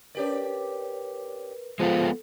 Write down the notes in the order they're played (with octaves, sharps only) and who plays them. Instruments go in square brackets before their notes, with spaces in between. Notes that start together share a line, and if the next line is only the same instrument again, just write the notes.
[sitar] C#4 G4 D5 [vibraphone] A#4 B4
[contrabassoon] F3 [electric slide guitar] G#3 B3 F4 [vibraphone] A4